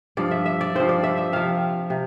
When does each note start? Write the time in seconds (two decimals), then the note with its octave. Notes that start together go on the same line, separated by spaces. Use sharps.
0.17 G2 F3 D5
0.31 E5
0.46 E5
0.61 D5
0.75 G2 F3 C5
0.89 D5
1.04 E5
1.18 E5
1.32 C3 F3 F5
1.90 C3